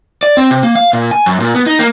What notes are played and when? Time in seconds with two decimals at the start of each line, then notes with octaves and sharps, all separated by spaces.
0.23 D5
0.37 C4
0.51 C3
0.63 A#3
0.75 F5
0.93 A#2
1.11 G#5
1.26 F#2
1.40 A#2
1.55 B3
1.67 D#4
1.79 A#3